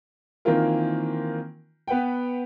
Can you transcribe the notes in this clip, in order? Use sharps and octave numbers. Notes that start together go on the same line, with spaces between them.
D#3 E3 A#3 C4 F4 A#4
B3 B4 F#5 G5